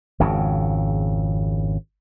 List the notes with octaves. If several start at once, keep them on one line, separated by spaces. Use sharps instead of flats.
G#1 F2 C#3